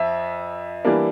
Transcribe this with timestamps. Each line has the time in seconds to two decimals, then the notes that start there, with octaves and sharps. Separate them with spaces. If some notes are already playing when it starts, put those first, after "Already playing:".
Already playing: F2 F3 E5
0.85 E3 G3 A#3 D4